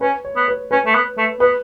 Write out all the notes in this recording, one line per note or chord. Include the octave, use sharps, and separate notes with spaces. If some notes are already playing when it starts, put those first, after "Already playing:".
C#4 B4
C#5
B3
B4
C#4 B4
A3
B3
A3
B3 B4